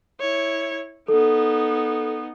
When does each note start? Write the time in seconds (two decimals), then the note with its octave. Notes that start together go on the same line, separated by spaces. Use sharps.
0.20 E4 C#5
1.08 B3 D#4 A4